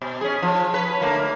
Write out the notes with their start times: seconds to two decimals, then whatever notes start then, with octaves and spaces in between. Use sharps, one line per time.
0.02 B2
0.21 C#4 G#4
0.43 F3
0.73 C#4 B4
1.02 D3 A3 A#3